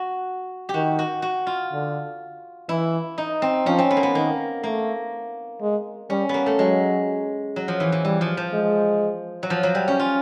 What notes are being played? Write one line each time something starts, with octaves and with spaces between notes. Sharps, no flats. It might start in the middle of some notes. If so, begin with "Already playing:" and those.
Already playing: F#4
G4
D#3 F#4
F#4
F#4
F4
D3
E3 E4
D#4
C4
F3 C#4
C4
B3
A#3
B3
D#3 A#3
A3 A#3
G#3
G3 C#4
A#3 B3
A3
F#3 G#3
F#3
F3
E3
E3
E3 G3
F3
F3
G#3
F#3
F3
F#3
G3
C#4
F4